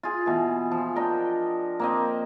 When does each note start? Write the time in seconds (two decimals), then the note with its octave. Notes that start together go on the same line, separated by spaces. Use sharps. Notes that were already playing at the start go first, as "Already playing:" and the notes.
0.03 F4 G#4
0.26 B2 E3
0.71 F3
0.95 D4 A#4 D#5 G5
1.80 A#3 C4 D#5